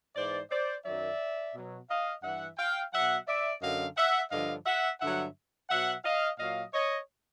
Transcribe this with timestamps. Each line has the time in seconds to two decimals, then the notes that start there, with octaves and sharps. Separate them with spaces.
0.16 G#2 E3 C5 D5
0.50 C5 D5
0.85 F#2 D#3 F#3 D5 E5
1.54 B2 F#3
1.89 D#5 F5
2.23 G2 E3 E5 F#5
2.58 F5 G5
2.93 B2 F#3 E5 F#5
3.27 D5 E5
3.61 F#2 D3 F#3 D#5 F5
3.96 E5 F#5
4.31 G2 D3 F3 D#5 F5
4.66 E5 F#5
5.00 G2 D3 F#3 E5 F#5
5.69 B2 F#3 E5 F#5
6.04 D#5 F5
6.39 A#2 F#3 D#5 F5
6.73 C#5 D#5